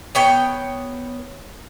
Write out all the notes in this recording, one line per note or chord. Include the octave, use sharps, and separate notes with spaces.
B3 C#5 G5